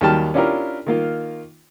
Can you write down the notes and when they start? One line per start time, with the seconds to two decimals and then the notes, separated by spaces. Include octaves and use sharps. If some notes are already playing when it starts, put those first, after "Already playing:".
0.01 D#2 F#3 G3 G5 A5 F6
0.34 C#4 D4 E4 F4 G4 A#4
0.86 D#3 A#3 F4